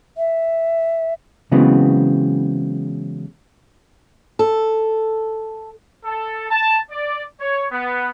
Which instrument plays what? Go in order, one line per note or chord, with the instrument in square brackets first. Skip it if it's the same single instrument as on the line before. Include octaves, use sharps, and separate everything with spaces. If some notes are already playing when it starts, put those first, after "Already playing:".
[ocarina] E5
[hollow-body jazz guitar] C#3 E3 F#3 G#3 B3 C4
[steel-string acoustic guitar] A4
[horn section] A4
A5
D5
C#5
B3